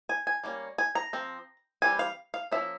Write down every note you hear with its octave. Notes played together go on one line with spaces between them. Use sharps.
G#5
G#5
G3 A#3 C#4
G#5
A#5
F3 C4
E3 G3 C4 G#5
F5
F5
F3 A#3 C#4 E5